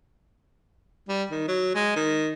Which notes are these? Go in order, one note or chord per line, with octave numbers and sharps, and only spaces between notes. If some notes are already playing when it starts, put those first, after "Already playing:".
G3
D#3
F#3
G#3
D#3